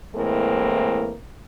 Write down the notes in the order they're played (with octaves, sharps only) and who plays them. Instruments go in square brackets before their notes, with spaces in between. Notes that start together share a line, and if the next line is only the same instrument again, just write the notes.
[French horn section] A2 E3 G#3 A#3 C4 A#4